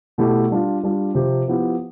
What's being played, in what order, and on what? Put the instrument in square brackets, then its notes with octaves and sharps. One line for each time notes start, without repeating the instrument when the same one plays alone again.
[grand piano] B2 A3 E4 G4
G3 D4 F4
G3 D4 F4
C3 F3 C4 G4
F3 B3 E4 G4